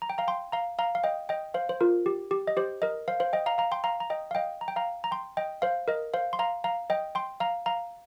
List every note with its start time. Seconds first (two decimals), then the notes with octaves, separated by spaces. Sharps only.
0.02 A#5
0.10 G5
0.18 F5 A#5
0.28 G5 C6
0.52 F5 A#5
0.79 F5 A#5
0.95 F5
1.04 D#5 G5
1.29 D#5 G5
1.54 C5 F5
1.69 C5
1.81 F4 A#4
2.06 G4
2.31 G4
2.47 D#5
2.57 G4 C5
2.82 A#4 D#5
3.08 C5 F5
3.20 C5 F5
3.33 D#5 G5
3.46 F5 A#5
3.58 F5 A#5
3.72 G5 C6
3.84 F5 A#5
4.00 A#5
4.10 D#5 G5
4.31 F5
4.35 D#5 G5
4.61 A#5
4.68 G5
4.76 F5 A#5
5.04 A#5
5.11 G5 C6
5.37 D#5 G5
5.62 C5 F5
5.88 A#4 D#5
6.14 C5 F5
6.33 C6
6.39 F5 A#5
6.64 F5 A#5
6.90 D#5 G5
7.15 G5 C6
7.40 F5 A#5
7.66 F5 A#5